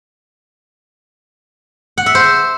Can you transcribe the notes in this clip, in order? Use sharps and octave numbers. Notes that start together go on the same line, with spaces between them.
F#5
E5
C5